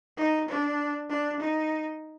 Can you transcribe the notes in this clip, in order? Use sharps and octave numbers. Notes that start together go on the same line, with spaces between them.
D#4
D4
D4
D#4